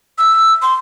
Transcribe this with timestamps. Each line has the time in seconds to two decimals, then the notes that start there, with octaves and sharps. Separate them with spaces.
0.18 E6
0.62 C6